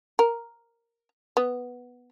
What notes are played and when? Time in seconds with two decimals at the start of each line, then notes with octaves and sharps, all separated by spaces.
0.19 A#4
1.37 B3